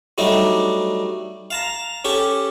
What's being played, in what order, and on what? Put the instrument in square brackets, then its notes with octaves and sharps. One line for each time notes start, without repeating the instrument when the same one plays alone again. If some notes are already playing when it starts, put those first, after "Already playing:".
[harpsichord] F#3 G3 A3 D4 D#4
F5 A5 A#5
C#4 G4 A4